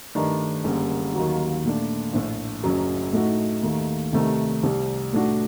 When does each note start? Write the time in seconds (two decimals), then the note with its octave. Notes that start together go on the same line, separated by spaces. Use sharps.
0.15 G2 D#3 A3 D4
0.64 F#1 F#2 D3 G3 A#3
1.14 D#2 D#3 F#3 A#3 F#4
1.64 A#2 A3 D4
2.13 A#1 A2 A3
2.64 F#1 F#2 F#3
3.13 A2 A3 D#4 F#4
3.63 D#2 D#3 A3
4.13 C2 C3 D#3 A3
4.63 C2 C3 G3
5.13 A2 A3 D4 F#4